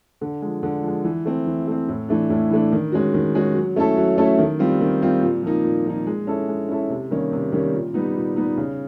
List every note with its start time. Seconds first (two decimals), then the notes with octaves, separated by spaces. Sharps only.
0.21 D3
0.42 F3 G#3
0.63 D3
0.83 F3 G#3
1.04 E3
1.25 A3 C4
1.47 E3
1.67 A3 C4
1.89 A2
2.09 E3 A3 D4
2.30 A2
2.50 E3 A3 D4
2.72 D#3
2.92 G#3 C#4 F#4
3.14 D#3
3.35 G#3 C#4 F#4
3.55 F#3
3.76 A3 C#4 E4 A4
3.97 F#3
4.18 A3 C#4 E4 A4
4.38 D#3
4.59 G3 C4 F4
4.81 D#3
5.02 G3 C4 F4
5.22 A#2
5.43 F3 A#3 D#4
5.64 A#2
5.85 F3 A#3 D#4
6.07 G#3
6.27 C#4 E4 A4
6.48 G#3
6.69 C#4 E4 A4
6.90 C3
7.11 D#3 G3 A#3 C#4
7.32 C3
7.52 D#3 G3 A#3 C#4
7.74 A#2
7.94 G3 B3 D#4
8.15 A#2
8.36 G3 B3 D#4
8.57 C#3